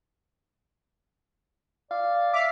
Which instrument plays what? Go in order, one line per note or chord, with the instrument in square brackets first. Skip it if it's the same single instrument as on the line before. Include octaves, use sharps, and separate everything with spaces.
[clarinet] D5 [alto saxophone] F5
[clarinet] E5 [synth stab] D6 F6 C7